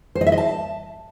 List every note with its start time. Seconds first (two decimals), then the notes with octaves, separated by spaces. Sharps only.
0.15 C5
0.21 D#5
0.27 E5
0.32 D#5
0.38 A5